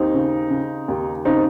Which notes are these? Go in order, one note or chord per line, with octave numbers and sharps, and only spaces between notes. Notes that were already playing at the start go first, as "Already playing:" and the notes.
Already playing: D#2 C4 D#4
C#3
C#3
D#2
C#3 C4 D#4